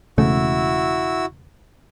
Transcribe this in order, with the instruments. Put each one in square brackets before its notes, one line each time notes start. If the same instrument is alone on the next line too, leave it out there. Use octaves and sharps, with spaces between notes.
[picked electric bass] E1 C#3 A3 [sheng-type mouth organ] E4 F#4 E6